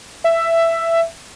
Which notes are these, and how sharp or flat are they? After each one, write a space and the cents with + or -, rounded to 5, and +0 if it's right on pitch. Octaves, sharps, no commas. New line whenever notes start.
E5 +10